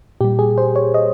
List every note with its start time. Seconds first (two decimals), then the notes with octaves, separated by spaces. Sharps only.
0.21 A#2 G3 G4
0.39 G#4
0.58 C5
0.76 C#5
0.94 D#5